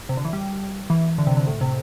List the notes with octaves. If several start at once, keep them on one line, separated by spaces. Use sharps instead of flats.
C3
D3
E3
G3
E3
D3
C3
D3
A2
C3